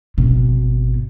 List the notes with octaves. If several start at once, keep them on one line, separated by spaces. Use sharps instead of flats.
G#1 B2